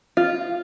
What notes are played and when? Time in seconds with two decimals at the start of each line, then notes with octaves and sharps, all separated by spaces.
0.17 F4